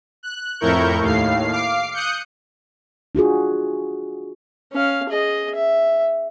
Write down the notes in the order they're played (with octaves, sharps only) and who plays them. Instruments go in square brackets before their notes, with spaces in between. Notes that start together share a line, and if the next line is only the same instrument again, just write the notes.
[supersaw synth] F#6
F2 A2 E4 A#4 C#6 G6
D#2 A2 F5 C7
F5 D6 C7
D#6 F#6 G6 C#7
[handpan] D4 F4 F#4 G#4
[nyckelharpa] C#4 F5
G#4 D#5
E5